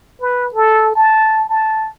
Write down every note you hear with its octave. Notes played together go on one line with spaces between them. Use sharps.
B4
A4
A5
A5